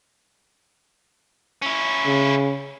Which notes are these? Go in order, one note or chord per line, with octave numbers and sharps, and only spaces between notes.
C#4 E4
C#3